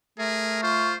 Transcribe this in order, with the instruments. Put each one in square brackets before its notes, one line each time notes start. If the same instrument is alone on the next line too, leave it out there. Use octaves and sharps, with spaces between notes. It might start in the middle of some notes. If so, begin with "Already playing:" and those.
[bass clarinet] A3 [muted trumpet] G#4 [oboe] A#4
[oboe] F4 [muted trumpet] C5 [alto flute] C#6